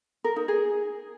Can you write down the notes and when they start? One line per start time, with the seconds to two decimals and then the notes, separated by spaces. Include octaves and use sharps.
0.24 A#4
0.36 D#4
0.48 G#4